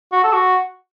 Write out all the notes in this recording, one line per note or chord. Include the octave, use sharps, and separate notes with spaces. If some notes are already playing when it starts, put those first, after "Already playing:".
F#4
A4
F#4